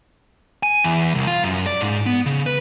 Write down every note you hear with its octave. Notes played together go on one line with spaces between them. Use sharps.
G#5
E2
C2
F4
F#2
D5
G#2
B3
C#3
B4